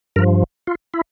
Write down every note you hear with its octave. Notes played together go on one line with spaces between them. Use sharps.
G2 F3 A#4
F4
E4